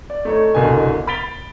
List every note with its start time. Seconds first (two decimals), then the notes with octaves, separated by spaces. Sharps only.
0.10 D5
0.25 A3 D#4 C#5
0.54 F#1 C2 B2 D3 D#5 G#5
1.07 B5 A6 B6 D7 F7 G7